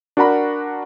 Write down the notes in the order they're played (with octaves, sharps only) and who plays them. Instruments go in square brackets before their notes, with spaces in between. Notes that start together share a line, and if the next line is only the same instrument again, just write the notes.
[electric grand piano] D4 F#4 A#4 F#5 A#5 B5